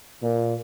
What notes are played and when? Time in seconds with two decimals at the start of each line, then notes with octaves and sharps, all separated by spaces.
0.22 A#2